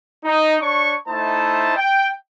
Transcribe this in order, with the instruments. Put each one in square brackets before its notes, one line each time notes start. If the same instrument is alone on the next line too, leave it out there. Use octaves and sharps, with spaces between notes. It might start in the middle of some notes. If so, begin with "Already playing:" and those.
[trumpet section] D#4
D4 C#5 C#6
A3 D#4 E4 C5 A5
G5